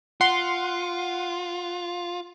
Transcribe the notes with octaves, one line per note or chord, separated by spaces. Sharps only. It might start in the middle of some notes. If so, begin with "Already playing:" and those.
F4 F#5 C6